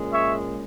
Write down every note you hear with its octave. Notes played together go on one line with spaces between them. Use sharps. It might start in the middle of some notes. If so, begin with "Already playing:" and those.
Already playing: A#2 G#3 C#4
C#5 E5